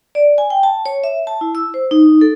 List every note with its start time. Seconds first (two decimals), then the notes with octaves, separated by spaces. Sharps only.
0.15 D5
0.38 G#5
0.50 G5
0.63 A5
0.86 C#5
1.04 E5
1.27 A5
1.41 E4
1.55 E6
1.74 C5
1.91 D#4
2.21 A4